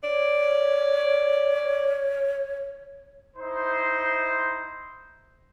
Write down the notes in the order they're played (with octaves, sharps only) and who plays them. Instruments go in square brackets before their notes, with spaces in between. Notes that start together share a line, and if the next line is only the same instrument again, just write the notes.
[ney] C#5 [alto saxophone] D5
[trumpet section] D#4 E4 C5